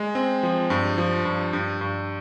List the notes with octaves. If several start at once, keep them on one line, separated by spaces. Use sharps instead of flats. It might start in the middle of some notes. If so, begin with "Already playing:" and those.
Already playing: G#3
C4
F3
G2
F3
G2
G2
G2